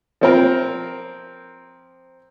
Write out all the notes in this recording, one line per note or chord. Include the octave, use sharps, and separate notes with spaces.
F3 C4 A#4